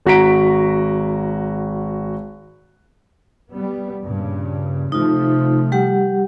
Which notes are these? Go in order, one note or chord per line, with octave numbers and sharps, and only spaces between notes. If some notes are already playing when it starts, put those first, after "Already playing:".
G#1 F#4 A#5 B6 D7
G3 B3
G2 A#2 C#3
C3 F3 A3 D#4 F4
G3 G4 F#5